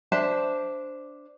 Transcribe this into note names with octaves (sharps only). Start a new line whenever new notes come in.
D4 C5 E5 A5